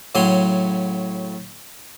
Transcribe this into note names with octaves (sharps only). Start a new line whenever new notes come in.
A2 C#3 F#3 G#5 C6